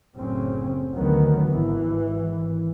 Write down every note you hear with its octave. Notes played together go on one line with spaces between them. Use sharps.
F#1 A2 C#3 C4 C#4
D2 D3 D#3 F#3 B3
G#1 E3